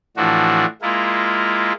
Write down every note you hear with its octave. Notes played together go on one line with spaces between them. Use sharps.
A2 E3 F3 D4 F#4
G#3 A#3 E4 F4